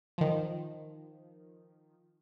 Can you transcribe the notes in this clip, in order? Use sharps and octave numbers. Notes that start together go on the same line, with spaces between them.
D#3 F3